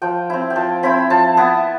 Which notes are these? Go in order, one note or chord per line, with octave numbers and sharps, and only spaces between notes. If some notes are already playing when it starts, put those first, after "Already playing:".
F3 G5
C4 E4
G5
F3 A5
C4 E4 B5
F3 A5
B3 E4